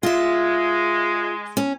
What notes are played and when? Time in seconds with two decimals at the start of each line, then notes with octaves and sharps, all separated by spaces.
0.03 G#3 F4 E5
1.57 C#4